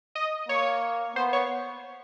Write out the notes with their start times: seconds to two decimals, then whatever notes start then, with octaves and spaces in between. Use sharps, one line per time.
0.15 D#5
0.49 A#3 C#5
1.16 B3 C5
1.33 C#5